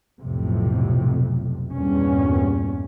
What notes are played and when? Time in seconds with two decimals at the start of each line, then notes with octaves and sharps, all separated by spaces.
0.21 B1 F2 A2 C3
1.73 E2 G2 A#2 G3 C#4